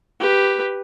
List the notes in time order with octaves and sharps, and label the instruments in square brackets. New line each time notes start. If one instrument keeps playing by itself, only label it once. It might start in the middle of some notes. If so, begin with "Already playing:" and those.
[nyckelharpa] G4 B4